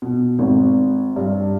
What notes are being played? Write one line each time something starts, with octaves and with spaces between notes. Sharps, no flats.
B2
G#1
G2